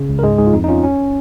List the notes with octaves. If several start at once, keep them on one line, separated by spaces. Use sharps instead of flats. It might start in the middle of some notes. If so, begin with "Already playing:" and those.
Already playing: C#3
C#2
A#4
G#2 G#3 G#4
G#2 G#4
F4
F2 D#4
D#4
C#4 F4
C#4